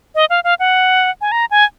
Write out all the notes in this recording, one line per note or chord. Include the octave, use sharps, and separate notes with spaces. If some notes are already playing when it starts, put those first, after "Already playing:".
D#5
F5
F5
F#5
G#5
A#5
G#5